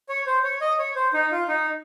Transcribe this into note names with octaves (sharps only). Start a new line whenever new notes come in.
C#5
C5
C#5
D#5
C#5
C5
D#4
F4
D#4